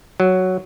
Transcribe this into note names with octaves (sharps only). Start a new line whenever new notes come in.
F#3